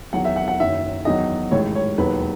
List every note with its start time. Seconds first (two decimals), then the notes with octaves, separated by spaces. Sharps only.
0.13 E2 D#3 F#3 F#5
0.25 E5
0.36 F#5
0.48 F#5
0.60 F#1 F#2 D#3 E5
1.05 E2 D#3 F#3 D#5
1.51 A1 G#2 D#3 C#5
1.75 C#5
1.98 E1 D#2 D#3 F#3 B4